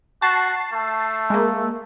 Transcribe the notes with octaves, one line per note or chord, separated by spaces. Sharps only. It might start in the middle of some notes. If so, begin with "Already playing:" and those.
F#4 A5 C7
A3
G#3 A#3